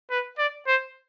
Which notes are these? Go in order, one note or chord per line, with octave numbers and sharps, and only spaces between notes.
B4
D5
C5